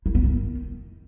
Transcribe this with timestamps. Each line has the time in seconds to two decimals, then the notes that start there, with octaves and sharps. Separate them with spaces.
0.06 E4
0.15 B3
0.24 D#3